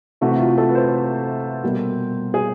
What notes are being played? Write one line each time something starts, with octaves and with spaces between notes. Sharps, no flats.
C3 E3 A3 F#4
F4
A4
B4
C5
B2 G3 A#3
G#4